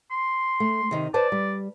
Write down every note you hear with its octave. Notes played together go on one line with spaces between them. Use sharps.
C6
A3
C3 D#3
B4 C5 D5 A5
G3